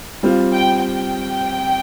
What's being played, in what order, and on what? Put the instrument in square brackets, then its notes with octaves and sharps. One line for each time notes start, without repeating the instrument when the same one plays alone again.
[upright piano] G3 C4 F4
[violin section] G5
G5